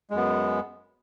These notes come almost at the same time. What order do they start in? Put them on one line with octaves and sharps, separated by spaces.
G#3 F#2 B3